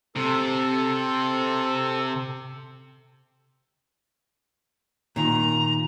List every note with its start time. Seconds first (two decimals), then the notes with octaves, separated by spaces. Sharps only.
0.16 C3 A4
5.16 A#2 D#3 A#5